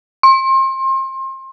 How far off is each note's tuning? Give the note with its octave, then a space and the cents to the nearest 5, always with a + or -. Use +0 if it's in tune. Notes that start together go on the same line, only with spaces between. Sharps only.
C6 +30